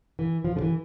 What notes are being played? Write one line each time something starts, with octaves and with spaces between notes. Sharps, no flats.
E3
F3
D3
E3